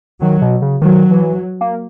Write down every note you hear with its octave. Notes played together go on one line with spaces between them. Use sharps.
D#3 F#3
B2
C#3
D#3 F#3
E3
A#3